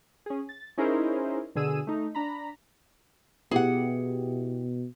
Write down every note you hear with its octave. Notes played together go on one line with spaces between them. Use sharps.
C#4 G#4
A6
C#4 D#4 E4 G#4 A#4 C5
B2 D3 G#4 E6 D#7
A3 D#4
D4 A#5 B5
B2 B3 E4 G4 G#4 F#5